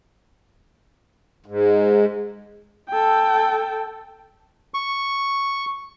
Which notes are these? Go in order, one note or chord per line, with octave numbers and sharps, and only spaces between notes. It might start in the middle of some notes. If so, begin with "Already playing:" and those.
G#2
A4 G5
C#6